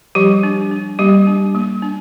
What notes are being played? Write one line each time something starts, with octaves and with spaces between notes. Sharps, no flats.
F3 G3 G4
D4
D4
G3 A#3 G4
D4
A#3
D4